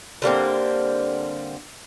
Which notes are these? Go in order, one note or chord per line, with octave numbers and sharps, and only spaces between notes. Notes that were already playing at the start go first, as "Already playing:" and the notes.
D3 G3 A#3 C4